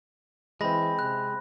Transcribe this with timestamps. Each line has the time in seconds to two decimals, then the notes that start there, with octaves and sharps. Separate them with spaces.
0.61 E3 G#3 C4 B5 A#6
0.99 C3 F#6